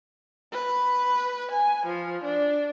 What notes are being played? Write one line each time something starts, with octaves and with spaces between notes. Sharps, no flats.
B4
G#5
F3
D4